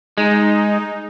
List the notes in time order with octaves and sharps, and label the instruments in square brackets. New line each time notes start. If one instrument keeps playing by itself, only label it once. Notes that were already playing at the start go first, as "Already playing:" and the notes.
[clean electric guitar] G#3 [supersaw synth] D#4